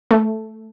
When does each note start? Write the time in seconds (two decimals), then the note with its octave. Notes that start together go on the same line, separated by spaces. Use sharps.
0.11 A3